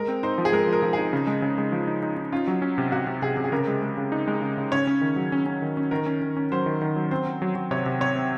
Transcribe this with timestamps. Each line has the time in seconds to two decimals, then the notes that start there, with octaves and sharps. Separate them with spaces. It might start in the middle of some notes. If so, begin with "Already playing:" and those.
Already playing: G#3 A#4
0.08 C4
0.23 D#4 C5
0.38 F3
0.45 G#4
0.53 G#3 A#4
0.67 F3
0.73 A#4
0.83 F3
0.93 D#4 G#4
1.13 C#3
1.27 G#3
1.42 C#3
1.58 G#3
1.72 F3
1.87 D#4
2.03 D#4
2.17 D#4
2.32 C#4 F4
2.47 F#3
2.62 C#4
2.78 C3
2.92 C3 F#4
3.07 C3
3.22 C3 G#4
3.37 C3
3.44 G#4
3.52 C#3 A#4
3.67 G#3
3.82 G#3
3.97 C#3
4.12 D#4
4.28 G#3
4.42 C#3
4.57 C#3
4.72 C#4 C#5
4.87 C#4
5.01 D#3
5.16 F#3
5.32 C#4
5.46 C#4
5.62 D#3
5.77 C#4
5.91 D#3 A#4
6.06 C#4
6.22 D#3
6.37 C#4
6.52 F#3 C5
6.66 D#3
6.82 D#3
6.96 F#3
7.11 C4 C5
7.27 C4
7.42 F#3
7.56 F#3
7.71 C3 C#5
7.86 C3
8.01 C4 C#5
8.15 C4